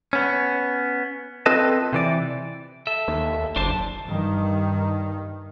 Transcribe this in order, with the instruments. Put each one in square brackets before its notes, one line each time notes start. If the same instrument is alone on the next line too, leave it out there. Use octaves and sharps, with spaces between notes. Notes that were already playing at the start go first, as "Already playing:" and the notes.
[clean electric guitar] B3 C#4
C4 F4 A4 B4 D#5 A5
C3 E3 D5
[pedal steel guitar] A4 E5
[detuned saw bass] D#2
[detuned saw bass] F#1 [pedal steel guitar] D4 C5 A5
[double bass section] G2 D#3